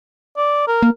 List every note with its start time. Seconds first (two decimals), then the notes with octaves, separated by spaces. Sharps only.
0.37 D5
0.67 A#4
0.83 A#3